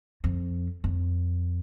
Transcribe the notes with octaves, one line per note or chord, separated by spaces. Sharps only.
F2
F2